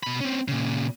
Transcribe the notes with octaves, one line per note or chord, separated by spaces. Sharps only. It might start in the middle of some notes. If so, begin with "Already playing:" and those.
B2 B5
C4 C#4
A#2 C#3